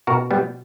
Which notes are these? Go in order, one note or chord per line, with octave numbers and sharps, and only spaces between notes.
B2 F#4 A#4
G3 B3